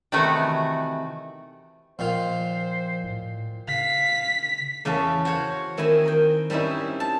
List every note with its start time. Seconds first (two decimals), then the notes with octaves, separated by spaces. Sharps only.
0.12 C3 D#3 E3 A3 F#4 F#5
1.99 A#2 D#3 F3 F4 C5
3.04 A2
3.68 C#3 F5 B6
4.85 E2 C#3 C#4 F5 A5
5.25 F#4 C5 C#5 F5
5.77 D#3 C4 E4 D#5 G#5
6.05 A#4 G5
6.50 G3 C4 C#4 D#4 E4
7.00 A5